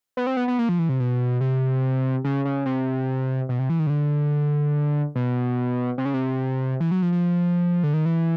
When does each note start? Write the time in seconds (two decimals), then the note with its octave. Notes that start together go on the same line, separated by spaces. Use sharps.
0.17 B3
0.27 C4
0.37 B3
0.48 B3
0.59 A#3
0.69 F3
0.79 E3
0.89 C3
1.00 B2
1.41 C3
2.24 C#3
2.45 C#3
2.66 C3
3.49 B2
3.59 C3
3.70 E3
3.79 D#3
3.87 C#3
3.90 D3
5.15 B2
5.98 C3
6.05 C#3
6.14 C3
6.80 E3
6.91 F#3
7.02 F3
7.12 F3
7.84 D3
7.94 D#3
8.06 E3